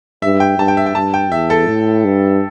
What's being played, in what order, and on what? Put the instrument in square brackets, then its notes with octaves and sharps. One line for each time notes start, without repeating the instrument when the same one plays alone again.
[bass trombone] G2 [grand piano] E5
[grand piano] G5
[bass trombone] G2 [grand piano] A5
[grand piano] G5
E5
G5
[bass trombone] G2 [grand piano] A5
[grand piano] G5
[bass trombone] E2 [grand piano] E5
[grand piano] A4
[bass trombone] A2
G2